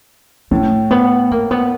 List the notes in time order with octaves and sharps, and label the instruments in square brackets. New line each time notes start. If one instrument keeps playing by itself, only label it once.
[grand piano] A2 [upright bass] A3
[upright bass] B3
A#3
B3